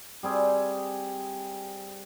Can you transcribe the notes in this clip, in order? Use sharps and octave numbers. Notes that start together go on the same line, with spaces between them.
G3 C4 G#4